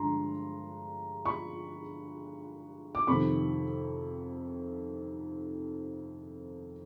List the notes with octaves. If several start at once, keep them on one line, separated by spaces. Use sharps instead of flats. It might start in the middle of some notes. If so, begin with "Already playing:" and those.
Already playing: G2 D3 F3 G#3 A#5 C6
B5 C#6
D6
F2 C3 D#3 B5 C#6